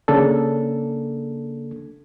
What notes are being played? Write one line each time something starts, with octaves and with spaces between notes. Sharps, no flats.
C#3 A#3 D4 A4